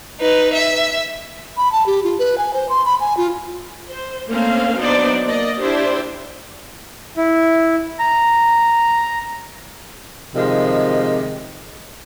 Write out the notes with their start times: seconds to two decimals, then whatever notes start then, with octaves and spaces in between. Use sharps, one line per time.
0.20 D#4 B4
0.53 E5
1.57 B5
1.72 A5
1.86 G4
2.04 F4
2.19 B4
2.38 G#5
2.54 C5
2.69 C6
2.86 B5
3.00 G#5
3.17 F4
3.90 C5
4.28 A3 A#3 C4 C#4 F5
4.79 F#3 B3 D4 D#4 C5 D5
5.26 A#3 D5 D#5
5.61 D4 E4 G4 C5
7.17 E4
7.99 A#5
10.36 C3 D#3 F3 G#3